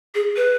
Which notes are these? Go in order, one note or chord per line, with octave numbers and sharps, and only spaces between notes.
G#4
B4